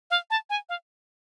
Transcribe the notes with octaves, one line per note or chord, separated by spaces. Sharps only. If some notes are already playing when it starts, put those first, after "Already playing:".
F5
A5
G#5
F5